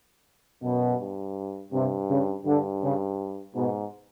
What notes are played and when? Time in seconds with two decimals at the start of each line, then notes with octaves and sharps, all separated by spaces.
0.63 F#2 B2
1.00 G2
1.72 G2 C3
2.09 C#3
2.46 G2 D3
2.82 C#3
3.55 G#2 B2